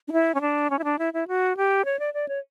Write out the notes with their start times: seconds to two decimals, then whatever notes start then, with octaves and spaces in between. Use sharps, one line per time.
0.08 D4
0.13 E4
0.35 C#4
0.41 D4
0.70 C#4
0.79 E4
0.84 D4
0.99 E4
1.13 E4
1.28 F#4
1.57 G4
1.85 C#5
1.99 D5
2.14 D5
2.28 C#5